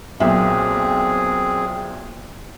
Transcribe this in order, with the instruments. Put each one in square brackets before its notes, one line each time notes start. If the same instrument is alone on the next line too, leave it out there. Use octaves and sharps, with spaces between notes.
[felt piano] B1 A#2 E5 [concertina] C4 G#4